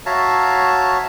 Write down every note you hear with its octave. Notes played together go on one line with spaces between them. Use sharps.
F#4 C#5 E5 F5 A5 A#5